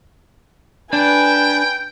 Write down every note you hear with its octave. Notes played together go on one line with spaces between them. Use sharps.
D4 B4 G5 G#5